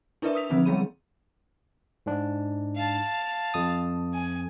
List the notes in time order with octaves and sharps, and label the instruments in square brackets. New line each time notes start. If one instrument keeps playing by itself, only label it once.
[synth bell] D4 E4 A#4 B4 D5 E5
D#6 E6 B6 F7
D3 F3 C4 D#4
G3 G#3 B3 G#4 B5 D#7
[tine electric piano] G#2 D4
[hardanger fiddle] F5 A5
[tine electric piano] F2 D#6
[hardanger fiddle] G#5